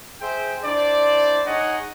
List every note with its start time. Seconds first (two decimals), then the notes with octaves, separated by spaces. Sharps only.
0.21 G#4 C5 E5 G5
0.65 D4 E4 C5 D5
1.47 D#4 G#4 C#5 D#5 F#5